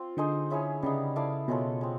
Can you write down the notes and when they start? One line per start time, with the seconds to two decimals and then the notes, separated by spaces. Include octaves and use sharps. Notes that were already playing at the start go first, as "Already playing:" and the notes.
Already playing: C4 F4
0.17 D3 D#4 G#4 C5 D#5
0.50 C#4 E4 G#4 C#5
0.82 C#3 G3 B3 D#4
1.16 E4 A4 D5 F5
1.48 B2 G#3 C#4 F4 A4
1.81 G#3 C4